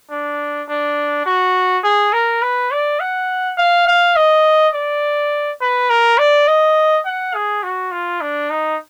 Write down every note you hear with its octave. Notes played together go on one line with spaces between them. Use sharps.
D4
D4
F#4
G#4
A#4
B4
D5
F#5
F5
F5
D#5
D5
B4
A#4
D5
D#5
F#5
G#4
F#4
F4
D4
D#4